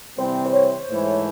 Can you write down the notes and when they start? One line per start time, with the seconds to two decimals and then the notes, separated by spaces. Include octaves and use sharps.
0.18 C3 E3 G3 C4 C5
0.46 C5
0.53 C#5
0.88 G#2 E3 A3